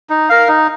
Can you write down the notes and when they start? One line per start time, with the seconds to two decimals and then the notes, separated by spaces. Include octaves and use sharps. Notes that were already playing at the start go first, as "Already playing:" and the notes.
0.10 D#4
0.29 A#4 F5
0.48 D#4